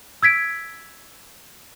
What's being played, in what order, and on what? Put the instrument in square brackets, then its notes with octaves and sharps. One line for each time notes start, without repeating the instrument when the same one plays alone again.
[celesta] E6 G#6 B6 D7